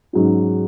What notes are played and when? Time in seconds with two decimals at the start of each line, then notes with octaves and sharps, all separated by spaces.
0.13 G#2 F#3 C#4 F#4